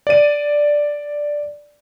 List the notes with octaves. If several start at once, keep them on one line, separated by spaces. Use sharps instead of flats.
D5 D#7